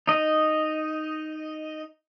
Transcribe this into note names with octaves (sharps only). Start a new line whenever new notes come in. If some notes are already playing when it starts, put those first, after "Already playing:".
D#4 D#5